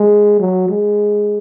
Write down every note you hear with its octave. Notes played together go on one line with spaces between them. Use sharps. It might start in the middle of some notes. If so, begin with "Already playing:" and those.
Already playing: G#3
F#3
G#3